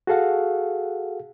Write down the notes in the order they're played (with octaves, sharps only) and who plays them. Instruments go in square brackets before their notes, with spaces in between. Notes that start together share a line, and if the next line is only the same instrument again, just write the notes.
[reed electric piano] F#4 G#4 A4 F5 F#5